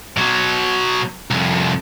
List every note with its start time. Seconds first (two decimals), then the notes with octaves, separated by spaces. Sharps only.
0.17 B2 F#3
1.30 C2 F2